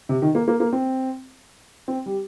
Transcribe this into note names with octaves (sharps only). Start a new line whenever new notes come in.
C3
D#3
A#3
A#3
A#3
C4
C4
G3